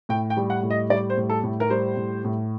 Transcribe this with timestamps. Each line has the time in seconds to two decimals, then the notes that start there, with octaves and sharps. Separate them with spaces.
0.09 A2 G5
0.30 G5
0.37 G3
0.50 F#5
0.63 A2
0.70 D#5
0.90 G3 D5
1.10 C5
1.17 A2
1.30 A4
1.44 A2
1.60 A#4
1.70 G3 C5
1.97 A2
2.24 A2